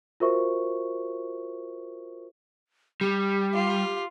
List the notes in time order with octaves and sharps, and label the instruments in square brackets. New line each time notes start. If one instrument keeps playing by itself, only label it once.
[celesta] F4 F#4 A#4 C5 E5 C#6
[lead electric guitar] G3 [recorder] G4
[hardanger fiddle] F4